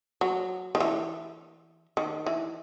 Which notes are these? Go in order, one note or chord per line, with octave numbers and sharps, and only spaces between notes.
F#3
D#3
E3
D#3
E3